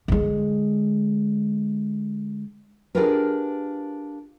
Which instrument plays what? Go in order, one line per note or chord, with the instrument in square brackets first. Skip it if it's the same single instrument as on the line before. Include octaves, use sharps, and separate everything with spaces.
[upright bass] D3 G#3
[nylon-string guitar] D4 F4 G4 G#4 A#4 B4